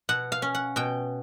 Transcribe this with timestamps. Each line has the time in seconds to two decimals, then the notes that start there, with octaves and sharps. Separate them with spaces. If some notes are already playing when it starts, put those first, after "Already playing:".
0.09 B2 F#5
0.32 F5
0.42 C#4
0.55 F#5
0.76 B2 G5